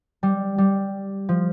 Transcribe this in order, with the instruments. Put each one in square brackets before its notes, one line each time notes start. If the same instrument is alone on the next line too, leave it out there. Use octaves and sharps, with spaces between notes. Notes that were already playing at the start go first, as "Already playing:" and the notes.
[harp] G3
G3
F3